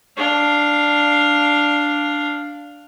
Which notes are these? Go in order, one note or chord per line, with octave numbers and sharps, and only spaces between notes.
D4 F5